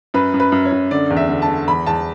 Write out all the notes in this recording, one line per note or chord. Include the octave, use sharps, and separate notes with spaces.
F#2 B4
F#2
B4
F#2
C#5
F#2
D3 D5
E2
E5
D3
A5
D3
E2 B5
E2 A5